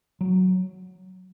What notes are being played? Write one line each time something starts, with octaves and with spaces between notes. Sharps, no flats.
F#3